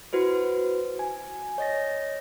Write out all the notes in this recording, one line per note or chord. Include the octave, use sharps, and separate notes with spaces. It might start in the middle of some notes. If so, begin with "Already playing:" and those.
E4 F#4 B4 C5
G#5
C#5 D#5 A6 A#6